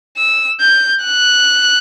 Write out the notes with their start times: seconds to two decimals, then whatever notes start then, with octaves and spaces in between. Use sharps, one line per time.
0.17 E6
0.61 G6
1.05 F#6